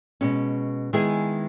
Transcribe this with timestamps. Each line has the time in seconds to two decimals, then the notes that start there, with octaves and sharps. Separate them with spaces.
0.21 B2 G#3 C#4
0.93 D#3 G#3 B3 E4 G#4